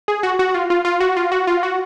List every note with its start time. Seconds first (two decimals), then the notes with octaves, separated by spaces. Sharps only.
0.08 G#4
0.23 F#4
0.39 F#4
0.55 F4
0.70 F4
0.85 F4
1.00 F#4
1.17 F4
1.32 F#4
1.47 F4
1.63 F#4